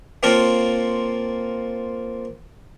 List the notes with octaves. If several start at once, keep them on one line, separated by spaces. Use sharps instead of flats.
A#3 C4 F4 A4 A#4 C#5